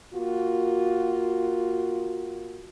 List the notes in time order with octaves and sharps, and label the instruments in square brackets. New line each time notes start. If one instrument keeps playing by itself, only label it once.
[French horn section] A#3 F4 F#4